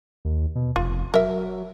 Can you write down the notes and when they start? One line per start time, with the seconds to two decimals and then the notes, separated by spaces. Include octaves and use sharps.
0.25 D#2
0.56 B2
0.76 F1 F4
1.14 F#3 A#4 E5